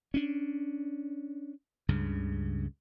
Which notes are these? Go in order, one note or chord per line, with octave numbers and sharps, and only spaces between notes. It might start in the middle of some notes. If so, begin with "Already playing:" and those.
C#4 D4
C#2 G2 C#3